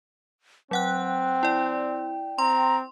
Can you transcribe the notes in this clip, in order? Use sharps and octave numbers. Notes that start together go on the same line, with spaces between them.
F#3 C4 F#5 G5 F#6
E4 D5
C4 A#5 C6